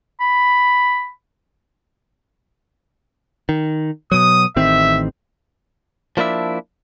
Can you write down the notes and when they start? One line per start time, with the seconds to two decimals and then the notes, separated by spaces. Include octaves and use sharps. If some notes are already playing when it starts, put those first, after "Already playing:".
0.20 B5
3.49 D#3
4.12 B2 F#3 D#6
4.56 A1 D#3 C4 E5
6.17 F3 A#3 D4 E4 E5